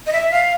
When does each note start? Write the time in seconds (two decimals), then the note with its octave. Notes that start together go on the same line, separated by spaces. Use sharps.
0.07 D#5
0.13 E5
0.31 F5